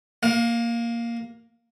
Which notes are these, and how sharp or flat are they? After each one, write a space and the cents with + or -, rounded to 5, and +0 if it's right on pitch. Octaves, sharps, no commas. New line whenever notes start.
A#3 +0 F5 +35